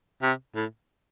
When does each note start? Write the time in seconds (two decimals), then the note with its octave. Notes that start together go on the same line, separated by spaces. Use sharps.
0.22 C3
0.55 A2